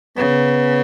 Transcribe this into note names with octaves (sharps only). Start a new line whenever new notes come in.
C#3 B3